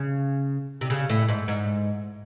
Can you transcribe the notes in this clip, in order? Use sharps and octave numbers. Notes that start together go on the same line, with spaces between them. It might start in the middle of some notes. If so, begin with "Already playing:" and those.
Already playing: C#3
C3
C#3
A2
G#2
G#2